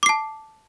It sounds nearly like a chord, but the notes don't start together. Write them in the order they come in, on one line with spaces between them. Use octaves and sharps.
D6 C7 A5